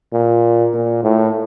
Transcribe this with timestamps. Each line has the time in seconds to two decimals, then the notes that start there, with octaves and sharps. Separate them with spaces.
0.13 A#2
0.74 A#2
1.03 A2